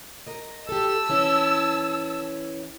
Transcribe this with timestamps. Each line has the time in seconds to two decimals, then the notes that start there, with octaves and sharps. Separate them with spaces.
0.27 A#4 D#5
0.69 G4 A4 A5 E6
1.09 E3 C#4 E4